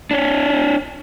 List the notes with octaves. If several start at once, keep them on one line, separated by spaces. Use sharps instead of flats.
D4 C#5